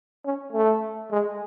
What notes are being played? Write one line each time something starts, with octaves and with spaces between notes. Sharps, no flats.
C#4
A3
G#3